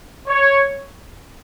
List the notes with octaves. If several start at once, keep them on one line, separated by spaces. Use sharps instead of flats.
C#5